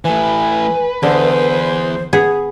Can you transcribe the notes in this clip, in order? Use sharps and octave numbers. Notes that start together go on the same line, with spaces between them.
E3 A3 B4 G#5
E2 D3 C5
B3 G#4